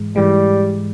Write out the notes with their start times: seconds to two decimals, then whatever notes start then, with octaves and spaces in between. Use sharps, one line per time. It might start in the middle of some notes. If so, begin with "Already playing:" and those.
Already playing: G#2 E3 G#3
0.16 G#2 E3 G3 G#3